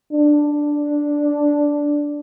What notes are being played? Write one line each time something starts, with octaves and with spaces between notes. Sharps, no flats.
D4